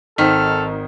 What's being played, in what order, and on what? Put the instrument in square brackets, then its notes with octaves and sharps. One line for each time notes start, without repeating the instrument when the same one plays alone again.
[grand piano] G#1 C5 B6 [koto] D#3 [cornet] A4 [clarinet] F6